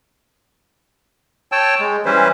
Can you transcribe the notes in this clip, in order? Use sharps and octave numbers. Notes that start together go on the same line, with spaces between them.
C#5 G5 A5 E6
G#3
E3 G3 C#4 E4 B4 C5